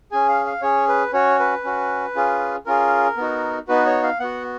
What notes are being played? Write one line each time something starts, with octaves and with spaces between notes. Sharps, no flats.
C#4 G#4 G#5
F5
F5
C#4 G#4 C#5
B4
C#4 F#4 C#5
B4
C#4 F#4
C#4 F4 G#4
C#4 F4 G#4 A#4
B3 D#4 F#4
B3 D#4 F#4 B4
C#5
F5
B3 F#4 F#5